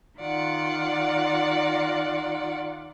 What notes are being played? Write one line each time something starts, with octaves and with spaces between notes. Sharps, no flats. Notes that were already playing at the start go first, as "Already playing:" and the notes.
D#3 F4 D5 F#5